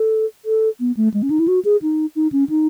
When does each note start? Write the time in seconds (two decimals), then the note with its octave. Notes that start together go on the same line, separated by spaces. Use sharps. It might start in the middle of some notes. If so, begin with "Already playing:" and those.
Already playing: A4
0.45 A4
0.80 B3
0.97 A3
1.14 G#3
1.23 C#4
1.30 D#4
1.39 E4
1.48 F#4
1.65 G#4
1.82 D#4
2.16 D#4
2.32 C#4
2.49 D#4